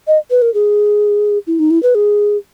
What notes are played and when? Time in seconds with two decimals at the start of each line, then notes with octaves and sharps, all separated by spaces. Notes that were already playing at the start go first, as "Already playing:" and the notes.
0.07 D#5
0.31 B4
0.42 A#4
0.54 G#4
1.47 E4
1.59 D#4
1.71 E4
1.83 B4
1.95 G#4